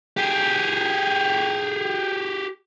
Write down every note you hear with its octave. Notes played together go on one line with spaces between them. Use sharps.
G4 G#4